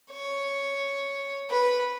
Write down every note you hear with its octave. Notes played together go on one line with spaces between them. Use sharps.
C#5
B4